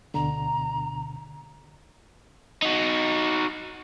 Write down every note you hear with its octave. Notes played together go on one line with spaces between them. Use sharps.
D2 B2 D3 A#5
D#4 F#4